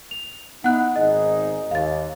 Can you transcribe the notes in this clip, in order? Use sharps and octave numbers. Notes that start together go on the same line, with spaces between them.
F7
B3 D#4 E4 F#5 F#6
G#1 D#4 G#4 D#5
D#2 F5 A6